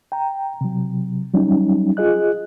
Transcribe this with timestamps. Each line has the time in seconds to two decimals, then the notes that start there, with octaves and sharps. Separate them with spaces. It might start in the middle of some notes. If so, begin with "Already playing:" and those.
0.12 G5 A#5
0.61 C3 F#3
1.34 F#3 G3 C#4 D#4
1.97 F4 G#4 D#5 F#6